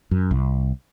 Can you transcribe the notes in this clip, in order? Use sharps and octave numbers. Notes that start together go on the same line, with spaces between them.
F#2
C2